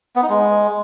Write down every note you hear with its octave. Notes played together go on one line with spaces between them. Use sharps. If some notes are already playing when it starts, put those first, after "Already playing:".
B3
D#4
G#3